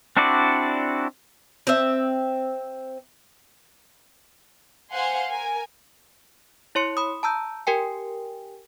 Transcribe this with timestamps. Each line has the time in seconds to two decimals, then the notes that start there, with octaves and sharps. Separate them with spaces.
0.17 C4 D4 E4 F#4 D5
1.67 C4 E5
4.91 C5 F5 F#5 G#5 C6
5.29 A#4 G#5
6.75 E4 C#5 C6 C#7
6.97 B5 D#6
7.23 A5 A#5 E6 G6
7.67 G4 A#4 G5 G#5